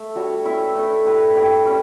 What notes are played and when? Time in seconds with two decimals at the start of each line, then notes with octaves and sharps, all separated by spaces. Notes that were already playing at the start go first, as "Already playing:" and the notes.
Already playing: A3 A4 E5
0.15 G3 D4 F#4 C#5
0.45 C#4 E4 B4 E5
0.75 A3 D4 A4
1.05 E4 G4 B4
1.35 D4 G4 B4
1.65 G3 C#4